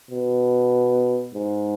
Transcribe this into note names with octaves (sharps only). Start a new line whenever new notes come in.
B2
G#2